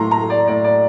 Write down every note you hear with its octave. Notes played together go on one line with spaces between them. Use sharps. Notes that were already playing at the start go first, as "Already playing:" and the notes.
Already playing: A2 F#3 A3 A#5 C6
A#5
A3
D5
A2 D5
D5